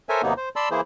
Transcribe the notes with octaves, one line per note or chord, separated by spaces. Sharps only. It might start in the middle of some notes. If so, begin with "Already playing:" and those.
A4 A#4 C5 C#5 E5 G#5
D#2 C3 F#3 A#3 B3 D#4
C5
D5 A5 B5 C6 E6
E3 A#3 E4 G#4 C5